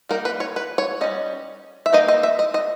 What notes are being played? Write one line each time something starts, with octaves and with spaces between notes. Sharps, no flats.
G3 A#3 D#4 A#4
B4
C#5
B4
C#5
G3 C#4 D#5
E5
E3 A#3 D#4 D#5
D#5
E5
D#5
D#5